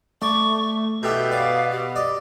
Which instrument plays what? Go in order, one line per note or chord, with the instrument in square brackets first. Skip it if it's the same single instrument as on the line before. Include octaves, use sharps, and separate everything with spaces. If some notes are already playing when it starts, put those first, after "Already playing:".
[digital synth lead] A3 [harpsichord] D5 [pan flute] C#6
[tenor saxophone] B2 [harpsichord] E4 G4 A4 [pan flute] E5 [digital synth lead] G6
[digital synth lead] B3 [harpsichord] D5 [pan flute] F5
[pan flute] G4
[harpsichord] D5 D#5